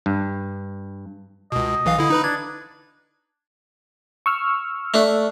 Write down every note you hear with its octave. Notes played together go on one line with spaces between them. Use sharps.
G2
C#2 B2 D#5
B1 E3 F5
D3 E4
D#4 B4 B5
D4 G#6
C#6 E6 F6
A3 D4